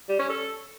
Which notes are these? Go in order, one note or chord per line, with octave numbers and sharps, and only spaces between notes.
G3
C#4
A4